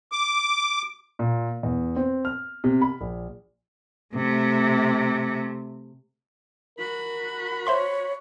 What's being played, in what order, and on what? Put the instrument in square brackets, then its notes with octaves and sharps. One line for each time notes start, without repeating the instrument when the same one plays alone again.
[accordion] D6
[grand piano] A#2
E2
C4
F6
C3
B5
A#1
[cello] C3 A3
[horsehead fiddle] F#4 B5 [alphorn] A#4
[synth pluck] C5 E5 C6 [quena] C#5